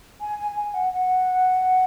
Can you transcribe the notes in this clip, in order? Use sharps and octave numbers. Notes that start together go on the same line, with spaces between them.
G#5
G#5
G#5
F#5
F#5